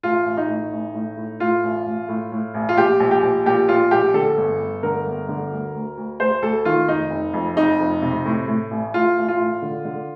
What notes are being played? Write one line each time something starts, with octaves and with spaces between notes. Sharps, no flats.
A1 F4
A1
D#4
A2
A1
A2
A2
A2 F4
A1
A1
A2
A2
A1
F4
A#1 G4
A#1
G4
A#1
A#2 G4
A#2 F4
A#1 G4
D3 A4
G1
G1
D3 A#4
G1
D3
D2
D2
D2
D2 C5
D2 A4
D#3 F4
F1 D#4
F1
F2
F1 D#4
F2
C3
A2
A2
A1
A2 F4
A1
F4
A2
D3
D3